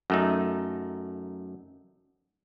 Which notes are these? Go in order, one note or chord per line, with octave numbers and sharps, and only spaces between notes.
F#2 A3 D#4